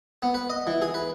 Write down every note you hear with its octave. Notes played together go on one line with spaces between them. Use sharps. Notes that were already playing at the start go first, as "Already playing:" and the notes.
B3
B4
D#5
E3
G#4
B4